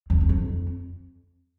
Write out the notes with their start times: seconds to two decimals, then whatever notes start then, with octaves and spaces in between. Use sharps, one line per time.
0.10 F2
0.21 E2
0.29 F2